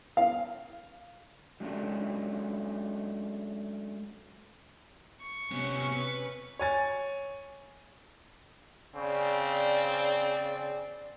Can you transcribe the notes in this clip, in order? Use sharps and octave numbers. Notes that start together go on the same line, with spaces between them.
F5
F#3 G#3 A3 C#4 D4
C#6
D2 C3 B3 C#4
B4
C#5 G#5 A6
C#3 C4 D5